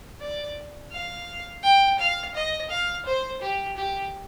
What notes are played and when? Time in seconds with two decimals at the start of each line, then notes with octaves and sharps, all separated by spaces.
0.21 D5
0.92 F5
1.63 G5
1.99 F5
2.35 D#5
2.70 F5
3.05 C5
3.41 G4
3.77 G4